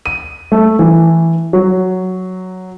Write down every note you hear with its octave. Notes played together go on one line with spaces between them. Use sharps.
D#7
A3
E3
F#3